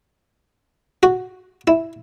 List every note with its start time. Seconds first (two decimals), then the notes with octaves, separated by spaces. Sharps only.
1.03 F#4
1.67 E4